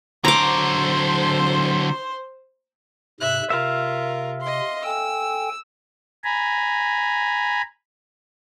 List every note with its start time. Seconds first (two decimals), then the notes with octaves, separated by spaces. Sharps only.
0.25 D3 F#3 C5 A#5 D6
3.20 G#2 C3 E5 F#6
3.50 C3 F4 A#4 E5 F5
4.41 D#5 C6
4.84 A4 G5 G#5 E6
6.24 G#5 A#5 B5